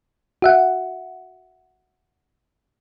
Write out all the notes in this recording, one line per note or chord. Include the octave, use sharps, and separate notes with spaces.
F#4 E5 F#5